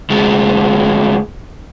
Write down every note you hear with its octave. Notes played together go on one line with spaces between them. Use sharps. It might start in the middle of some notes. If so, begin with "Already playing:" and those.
D2 G#3